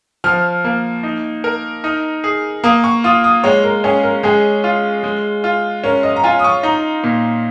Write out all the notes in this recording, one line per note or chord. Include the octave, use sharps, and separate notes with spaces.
F3 F6
A#3
D#4
A#4
D#4
G#4
A#3 D#6
C#6
F4 D#6
D#6
G#3 C#5
A#4
C#4 G#4
A#4
G#3 G#4
F4
G#3
F4
C#4 A#4
D#5
A#5
F4 G#5
D#6
C#6
D#4 A#5
A#2